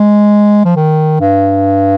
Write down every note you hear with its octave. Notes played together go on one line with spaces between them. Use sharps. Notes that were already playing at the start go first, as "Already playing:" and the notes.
Already playing: G#3
F3
D#3
G2